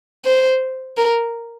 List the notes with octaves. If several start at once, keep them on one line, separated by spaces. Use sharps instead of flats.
C5
A#4